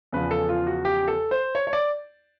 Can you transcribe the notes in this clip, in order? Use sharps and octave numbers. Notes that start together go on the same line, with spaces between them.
E2 C#3 F3 B4
A4
F4
F#4
G4
A4
C5
C#5
C#5
D5